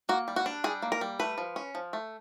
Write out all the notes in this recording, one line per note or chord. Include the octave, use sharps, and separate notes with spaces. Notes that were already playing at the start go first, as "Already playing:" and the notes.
A#3 F#4
G3
F#4
D4
G3 G#4
A#3
A#4
G3
A3 B4
F3
C#4
F3
A3